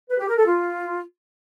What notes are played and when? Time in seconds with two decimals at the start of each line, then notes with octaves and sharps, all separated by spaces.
0.10 B4
0.19 G4
0.28 A#4
0.37 A4
0.46 F4